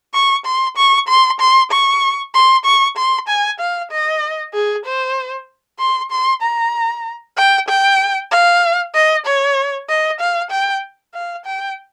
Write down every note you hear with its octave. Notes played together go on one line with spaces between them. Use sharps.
C#6
C6
C#6
C6
C6
C#6
C6
C#6
C6
G#5
F5
D#5
G#4
C5
C6
C6
A#5
G5
G5
F5
D#5
C#5
D#5
F5
G5
F5
G5